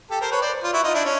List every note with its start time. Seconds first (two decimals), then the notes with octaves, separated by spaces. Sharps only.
0.10 G4 A4
0.21 A#4 C5
0.31 B4 C#5
0.42 C5 D5
0.63 F4
0.73 E4 F#4
0.84 D#4 F4
0.94 D4 E4
1.05 C#4